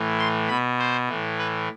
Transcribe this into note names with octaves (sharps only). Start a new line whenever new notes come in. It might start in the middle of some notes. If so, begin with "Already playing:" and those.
Already playing: A2 E3
C6
B2 B5
C5
A2 E3
B4